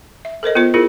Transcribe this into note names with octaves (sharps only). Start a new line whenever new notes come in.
E5
A4 A#4 C5 D#5
B3 F4 C5
E4 F4 G#4 A#4